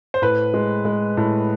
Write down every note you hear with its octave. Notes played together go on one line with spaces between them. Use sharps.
C5
A2 B4
G#3
G#3
A2